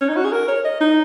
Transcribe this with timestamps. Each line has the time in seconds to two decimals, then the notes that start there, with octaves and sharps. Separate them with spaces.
0.01 C#4
0.09 D#4
0.17 F#4
0.25 G#4
0.33 A#4
0.48 C#5
0.65 D#5
0.81 D#4